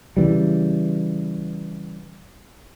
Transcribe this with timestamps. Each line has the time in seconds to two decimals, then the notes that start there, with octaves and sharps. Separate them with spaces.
0.17 C#3 E3 G3